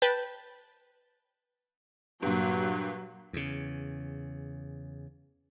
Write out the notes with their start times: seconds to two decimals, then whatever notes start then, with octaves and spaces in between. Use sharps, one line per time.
0.02 B4 G5 A5
2.22 G2 A#2 F#3
3.33 E2 C#3